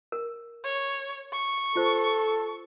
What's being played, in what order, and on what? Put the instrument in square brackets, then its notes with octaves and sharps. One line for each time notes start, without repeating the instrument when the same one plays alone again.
[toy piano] A#4
[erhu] C#5
C#6
[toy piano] F4 C5 [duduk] A4